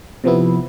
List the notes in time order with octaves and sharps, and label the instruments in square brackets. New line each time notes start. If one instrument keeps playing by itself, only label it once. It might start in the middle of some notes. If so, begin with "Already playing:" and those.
[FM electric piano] C3 F3 B3 E4